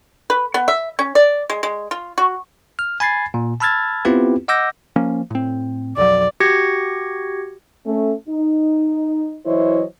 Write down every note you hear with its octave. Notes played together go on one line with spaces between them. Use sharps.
B4
B3
E5
C#4
D5
G#3
G#3
F4
F#4
F6
G#5 B5 G#6 A6 C7
A#2
A5 B5 E6 F6 G#6 A6
B3 C4 E4 F4 G4 B4
D#5 F#5 D6 E6 G6 A#6
F3 A#3 C#4
A2 C4
B1 F2 F#3 D5
F#4 G4 G#6 A#6 C#7
A3 C#4
D#4
E3 F#3 E4 C5 C#5 D#5